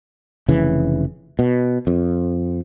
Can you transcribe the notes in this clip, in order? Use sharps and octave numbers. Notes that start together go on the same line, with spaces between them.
F1 C#3 E3
B2
F2